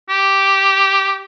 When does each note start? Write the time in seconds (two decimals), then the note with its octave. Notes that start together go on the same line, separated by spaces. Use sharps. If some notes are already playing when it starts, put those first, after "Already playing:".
0.09 G4